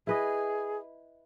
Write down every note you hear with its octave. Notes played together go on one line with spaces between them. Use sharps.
E4 G#4 B4 D#5